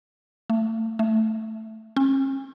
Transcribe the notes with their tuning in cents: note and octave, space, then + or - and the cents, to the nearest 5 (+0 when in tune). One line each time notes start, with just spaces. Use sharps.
A3 +30
A3 +5
C#4 -40